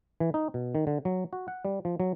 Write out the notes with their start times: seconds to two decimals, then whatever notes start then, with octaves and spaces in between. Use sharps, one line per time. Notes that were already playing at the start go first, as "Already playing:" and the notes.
0.20 E3
0.34 D#4
0.54 B2
0.75 D#3
0.87 D3
1.05 F#3
1.33 F#4
1.48 F#5
1.65 G3
1.85 F3
2.00 F#3